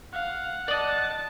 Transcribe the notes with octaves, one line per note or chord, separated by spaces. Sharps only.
F5 F#5
D5 D#5 A5 A6